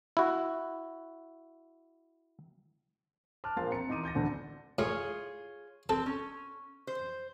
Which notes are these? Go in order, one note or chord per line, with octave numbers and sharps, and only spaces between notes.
E4 F#4
A5 D6 F6 F#6
A#1 F3 A#4 C6 A6
C4 A#5 C#7
E3 D#4 C6 D6 D#7
D6 G6 A6 A#6
D2 D3
A2 F4 G#4 C#5
C4 A4
C#4
C5